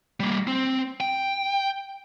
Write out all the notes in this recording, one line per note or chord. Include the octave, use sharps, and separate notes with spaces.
G3 A#3
C4
G5